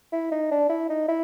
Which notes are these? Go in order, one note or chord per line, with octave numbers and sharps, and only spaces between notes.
E4
D#4
D4
E4
D#4
E4